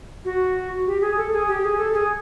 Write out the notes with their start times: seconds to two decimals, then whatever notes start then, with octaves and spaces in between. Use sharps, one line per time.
0.25 F#4
0.87 G4
1.01 G#4
1.17 A4
1.32 G#4
1.48 G4
1.63 G#4
1.78 A4
1.93 G#4